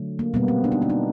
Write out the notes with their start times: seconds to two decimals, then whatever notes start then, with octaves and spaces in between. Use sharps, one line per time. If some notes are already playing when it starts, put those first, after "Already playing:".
Already playing: D3 F#3 A3
0.19 A#3
0.34 B2 G3 A#3 B3
0.48 C4
0.64 D4
0.72 D#4
0.82 D4
0.90 D#4